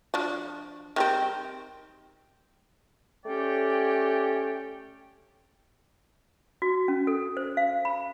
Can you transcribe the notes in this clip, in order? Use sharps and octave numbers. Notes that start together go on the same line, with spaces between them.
F3 D4 F#4
D#3 G3 C4
A3 C#4 G4 C#5 D5 G5
F#4
C#4
A4
C5
F5
B5